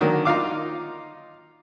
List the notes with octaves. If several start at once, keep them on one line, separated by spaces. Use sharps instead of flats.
D3 D#3 F#3 A#3
D#4 F4 F5 D6